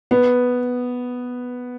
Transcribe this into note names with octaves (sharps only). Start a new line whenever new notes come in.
B3